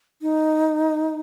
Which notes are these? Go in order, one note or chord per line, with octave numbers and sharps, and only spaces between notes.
D#4